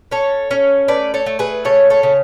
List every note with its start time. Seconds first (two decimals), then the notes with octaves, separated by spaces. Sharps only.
0.11 C#4 A4 C#5
0.51 C#4
0.88 A3 B4 D5
1.14 A4 C#5
1.26 A3
1.39 G#4 B4
1.65 C#3 A4 C#5
1.90 A4 C#5
2.03 C#3